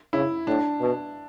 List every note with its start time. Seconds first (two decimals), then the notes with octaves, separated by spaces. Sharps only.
0.13 C#3 E4
0.47 A2 D4
0.80 B2